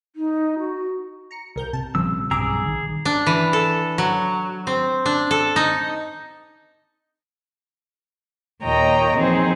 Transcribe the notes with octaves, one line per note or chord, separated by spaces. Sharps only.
D#4
F#4
A#5 C#7
C2 A#4 G6
C3 A5
A#1 C#3 F3 G3 C4 E6
B1 G2 C#3 G#4 A#5 D6 E6
D#3
D4
E3
A4
F#3
C4
D4
A4
D#4
D#2 A#2 C#5 D#5 G5 A#5
E3 F3 C4 D#4 G#4 C5